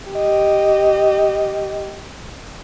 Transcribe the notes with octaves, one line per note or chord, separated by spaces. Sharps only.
G4 D#5